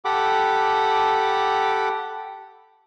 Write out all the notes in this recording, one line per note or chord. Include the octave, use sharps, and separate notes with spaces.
G4 A4 F#5 B5 D6